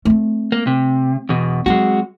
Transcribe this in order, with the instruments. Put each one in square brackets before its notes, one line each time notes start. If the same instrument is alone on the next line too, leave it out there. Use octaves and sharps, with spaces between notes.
[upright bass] A3 C4
[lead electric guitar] A#3
C3
E2 B2
[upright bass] F#3 C4 [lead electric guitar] G#3 F#4